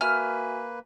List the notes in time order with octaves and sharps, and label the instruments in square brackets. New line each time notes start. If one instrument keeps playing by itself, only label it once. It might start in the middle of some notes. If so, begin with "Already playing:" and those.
[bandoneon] A#3 B4 [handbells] F#4 E5 G#5 [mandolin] F6